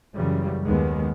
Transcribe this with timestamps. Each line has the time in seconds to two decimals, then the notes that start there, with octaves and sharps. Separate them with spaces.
0.16 F#2 C#3 E3 G3
0.64 D#2 D#3 G#3 B3